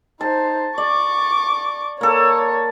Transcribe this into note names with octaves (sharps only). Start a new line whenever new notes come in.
D#4 C5 A5
D5 C#6 D6
A#3 A4 C#5